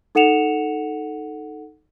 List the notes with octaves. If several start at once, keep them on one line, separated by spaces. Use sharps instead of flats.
D#4 A4 F#5 C#7 E7 F7